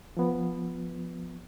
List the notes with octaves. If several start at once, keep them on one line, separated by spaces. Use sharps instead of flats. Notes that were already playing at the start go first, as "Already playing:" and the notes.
F3 B3